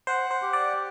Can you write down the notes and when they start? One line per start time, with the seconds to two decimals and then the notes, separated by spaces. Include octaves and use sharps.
0.07 C5 F#5
0.31 C5
0.42 G4
0.53 D5